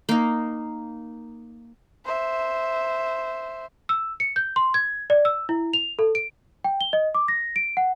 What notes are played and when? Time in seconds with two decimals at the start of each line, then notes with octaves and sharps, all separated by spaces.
0.09 A#3 D#4
2.05 C5 E5
3.89 E6
4.20 C#7
4.36 G6
4.56 C6
4.74 G#6
5.10 D5
5.25 E6
5.49 E4
5.73 F7
5.99 A4
6.15 D7
6.64 G5
6.81 G7
6.93 D#5
7.15 D6
7.28 A#6
7.56 D7
7.77 F#5